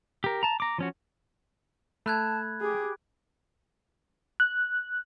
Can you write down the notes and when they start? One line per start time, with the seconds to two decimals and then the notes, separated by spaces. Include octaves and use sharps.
0.24 G4 A#4
0.43 A5 A#5
0.60 A#5 D6
0.78 F3 C#4 F#4
2.06 A3 A5 B5 F#6 G#6
2.61 G4 G#4
4.40 F#6